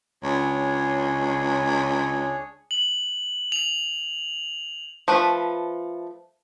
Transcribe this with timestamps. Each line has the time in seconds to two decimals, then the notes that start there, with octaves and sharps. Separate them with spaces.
0.23 C#2 D4 G#4 C#5
2.71 F#7
3.52 F7
5.08 F3 A3 B4 B5